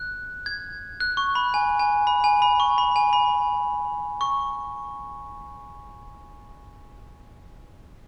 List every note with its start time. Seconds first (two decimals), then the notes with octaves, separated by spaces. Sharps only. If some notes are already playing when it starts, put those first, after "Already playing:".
Already playing: F#6
0.46 G#6
1.00 F#6
1.17 C#6
1.35 B5
1.54 G#5
1.79 G#5
2.07 B5
2.24 G#5
2.42 B5
2.60 C#6
2.78 B5
2.96 G#5
3.13 B5
4.21 C#6